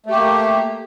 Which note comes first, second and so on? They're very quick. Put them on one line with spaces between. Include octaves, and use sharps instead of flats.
A3 G4 A#3